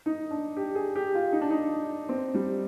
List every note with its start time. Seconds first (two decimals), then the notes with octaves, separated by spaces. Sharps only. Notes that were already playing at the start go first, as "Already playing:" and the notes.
0.06 D#4
0.31 D4
0.57 G4
0.75 G#4
0.96 G4
1.15 F4
1.33 D#4
1.41 D4
1.51 D#4
2.09 C4
2.35 G3